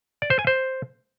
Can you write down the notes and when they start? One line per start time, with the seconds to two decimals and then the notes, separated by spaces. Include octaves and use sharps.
0.22 D5
0.30 C5
0.39 G#5
0.47 C5